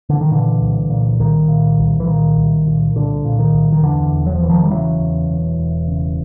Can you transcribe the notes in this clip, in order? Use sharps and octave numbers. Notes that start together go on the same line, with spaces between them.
D3
D#3
A#2 D3 E3
C2
A#2
C2 D#3
A#2
C2
E3
A#2 D#3
C2
A#2
C2 D3
A#2
D#3
C2
D#3
E2 D3 E3
E1
F#3
F3
E1 E3
D#3 F3
G3
C#3 E3 F#3
E2
E1
E1
C#3